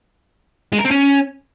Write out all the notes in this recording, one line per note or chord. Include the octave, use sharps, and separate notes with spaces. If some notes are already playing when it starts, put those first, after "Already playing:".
G#3
A#4
C4
C#4